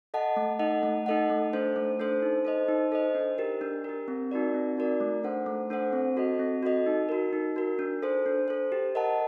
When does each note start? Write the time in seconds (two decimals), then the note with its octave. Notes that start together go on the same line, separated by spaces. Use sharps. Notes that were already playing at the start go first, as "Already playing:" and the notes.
0.14 A4 D#5 F#5 A5
0.36 A3
0.59 D#4 A4 D#5 F#5
0.83 A3
1.06 D#4 A4 D#5 F#5
1.30 A3
1.53 D4 A4 C5
1.76 A3
2.00 D4 A4 C5
2.22 D#4
2.45 A4 C5 D#5
2.68 D#4
2.92 A4 C5 D#5
3.15 D4
3.38 G4 A#4
3.61 D4
3.84 G4 A#4
4.08 C4
4.31 D#4 F#4 A#4 D5
4.54 C4
4.77 D#4 F#4 A#4 D5
5.00 A3
5.24 D4 A4 C5 F#5
5.46 A3
5.70 D4 A4 C5 F#5
5.93 C4
6.17 F#4 A4 D#5
6.39 C4
6.63 F#4 A4 D#5
6.86 D#4
7.09 F#4 A#4
7.33 D#4
7.56 F#4 A#4
7.79 D4
8.02 A4 C5
8.26 D4
8.48 A4 C5
8.72 G4
8.95 A#4 D#5 F#5 A5